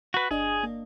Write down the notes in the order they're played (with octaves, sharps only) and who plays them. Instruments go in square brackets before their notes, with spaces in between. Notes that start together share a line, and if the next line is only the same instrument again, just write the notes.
[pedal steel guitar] F#4 B4
[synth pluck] G1 D4 D#5 [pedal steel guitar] G#4
[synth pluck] A#3